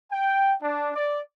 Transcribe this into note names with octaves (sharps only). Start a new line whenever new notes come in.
G5
D4
D5